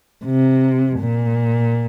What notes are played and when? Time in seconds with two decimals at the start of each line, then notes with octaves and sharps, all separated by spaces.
0.25 C3
1.00 A#2